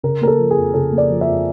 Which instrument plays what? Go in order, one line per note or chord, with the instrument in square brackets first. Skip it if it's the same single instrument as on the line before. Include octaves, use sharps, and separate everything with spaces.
[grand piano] C#3 A#4
A#3 A#4
A4
F3
G#4
F2
C#3 A4
A#3
D5
F3
E5
F2